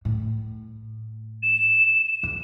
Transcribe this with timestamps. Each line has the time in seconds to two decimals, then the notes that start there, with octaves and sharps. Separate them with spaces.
0.05 A2
1.42 E7
2.23 E2